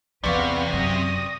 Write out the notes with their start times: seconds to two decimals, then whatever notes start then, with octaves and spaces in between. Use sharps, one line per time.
0.24 E2 C3 C#4 B4 D5 F5 F#5 C#6
0.73 F#2 D#6 A#6